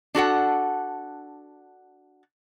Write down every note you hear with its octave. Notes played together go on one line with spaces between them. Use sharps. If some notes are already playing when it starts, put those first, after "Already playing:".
D4 F#4 A4 F#5